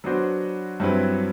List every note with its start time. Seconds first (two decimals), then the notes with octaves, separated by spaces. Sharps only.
0.04 F#3 B3 D4 F#4 C5
0.80 G2 F#3 C4 E4 B4